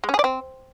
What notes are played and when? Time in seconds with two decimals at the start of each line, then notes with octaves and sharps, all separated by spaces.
0.04 G#3
0.09 C#4
0.14 G#4
0.19 D5
0.24 C4